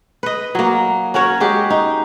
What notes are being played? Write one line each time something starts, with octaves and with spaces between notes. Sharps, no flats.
B4 D#5
F#3 A#3
C#4 F#4 A#4 C#5
G#3 F#4 G4
D#4